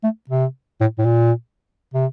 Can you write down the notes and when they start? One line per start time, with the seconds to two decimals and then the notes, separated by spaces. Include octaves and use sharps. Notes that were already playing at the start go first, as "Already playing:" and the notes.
0.04 A3
0.30 C3
0.81 A2
0.99 A2
1.05 A#2
1.94 C3